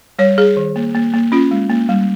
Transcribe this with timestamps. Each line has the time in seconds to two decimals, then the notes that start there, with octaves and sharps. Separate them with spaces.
0.19 G3 C#5
0.38 G3 G#4
0.57 D#3
0.76 A#3
0.95 A#3
1.14 A#3
1.32 C#4 F4
1.51 G#3
1.69 A#3
1.89 G3